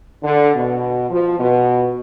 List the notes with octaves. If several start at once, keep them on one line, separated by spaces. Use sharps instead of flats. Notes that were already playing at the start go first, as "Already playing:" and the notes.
D3
B2
F3
B2